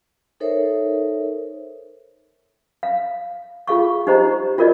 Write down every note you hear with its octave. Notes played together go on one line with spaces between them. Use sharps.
D#4 A4 A#4 C5 C#5 E5
F5
F4 G#4 F5 C#6
D#4 G4 C5 D#5 A#5
F4 F#4 A#4 D5 D#5